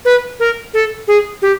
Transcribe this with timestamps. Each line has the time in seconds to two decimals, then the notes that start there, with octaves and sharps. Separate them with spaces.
0.05 B4
0.40 A#4
0.74 A4
1.08 G#4
1.42 G4